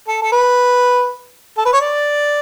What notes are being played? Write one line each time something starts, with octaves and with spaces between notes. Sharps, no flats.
A4
A4
B4
A4
B4
C#5
D5